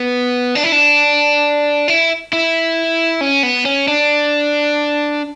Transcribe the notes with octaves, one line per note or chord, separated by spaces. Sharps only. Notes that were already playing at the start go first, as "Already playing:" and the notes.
Already playing: B3
D4
E4
D4
E4
E4
C#4
B3
C#4
D4